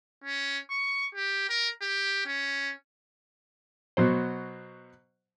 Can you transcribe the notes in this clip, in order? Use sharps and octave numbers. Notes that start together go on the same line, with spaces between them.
C#4
C#6
G4
A#4
G4
C#4
B2 F#3 C5